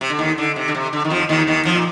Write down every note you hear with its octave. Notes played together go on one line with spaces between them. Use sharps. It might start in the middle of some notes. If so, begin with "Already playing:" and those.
C3
D3
D#2 D#3
D3
C3
D3
C3
D3
D#3
F2 F3
D#2 D#3
D#2 D#3
F2 F3
A#2